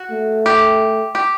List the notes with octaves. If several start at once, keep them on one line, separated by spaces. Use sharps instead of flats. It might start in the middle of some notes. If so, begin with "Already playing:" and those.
Already playing: F#4
A3
G4
G4